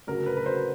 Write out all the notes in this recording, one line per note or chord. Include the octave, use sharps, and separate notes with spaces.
D2 C#3 F#3 A#4
B4
B4
C5